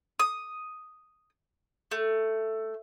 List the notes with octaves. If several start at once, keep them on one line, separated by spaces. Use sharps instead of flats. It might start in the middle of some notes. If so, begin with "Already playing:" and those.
D#6
A3